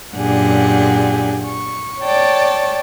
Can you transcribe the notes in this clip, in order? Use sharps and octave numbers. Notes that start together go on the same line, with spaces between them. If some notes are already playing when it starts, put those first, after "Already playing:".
F#2 A#2 D4 G4 G#4 F#5
C#6
C#5 D5 G5 A5